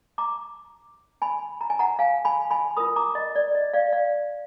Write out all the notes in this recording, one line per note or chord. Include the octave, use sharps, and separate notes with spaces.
A#5 D6
G#5 B5
A#5
G#5
F#5 A#5
F5 G#5
G#5 B5
G#5 B5
F4 A#4 B5 D#6
A#5 D6
D#5
D5
D#5
D5 F5
D5 F5